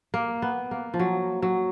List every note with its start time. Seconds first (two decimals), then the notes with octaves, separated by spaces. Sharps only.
0.14 A#3
0.42 B3
0.71 A#3
0.94 F3
0.99 F#3
1.42 F#3